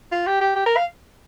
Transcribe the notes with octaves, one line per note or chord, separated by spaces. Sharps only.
F4
G4
G4
G4
A#4
F5